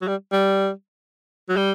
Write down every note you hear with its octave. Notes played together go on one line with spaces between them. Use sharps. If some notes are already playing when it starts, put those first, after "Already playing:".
F#3
G3
G3
F#3
G3